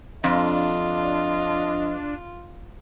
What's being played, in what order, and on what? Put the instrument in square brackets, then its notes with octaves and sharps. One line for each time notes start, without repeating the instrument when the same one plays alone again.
[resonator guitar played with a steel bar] F2 [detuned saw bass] D4 [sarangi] F4 [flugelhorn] D#5